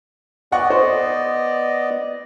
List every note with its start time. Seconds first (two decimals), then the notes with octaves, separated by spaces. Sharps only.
0.52 B3 D5 D#5 F#5 C#6
0.70 C5